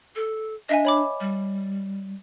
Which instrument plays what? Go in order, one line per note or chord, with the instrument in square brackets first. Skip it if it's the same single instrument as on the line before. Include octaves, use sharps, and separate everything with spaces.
[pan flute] A4
[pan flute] D4 [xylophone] D#5 E5 G#5
[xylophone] C#5 B5 D6
[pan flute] G3